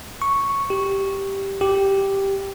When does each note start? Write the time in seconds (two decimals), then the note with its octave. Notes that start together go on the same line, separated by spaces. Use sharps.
0.22 C#6
0.70 G4
1.61 G4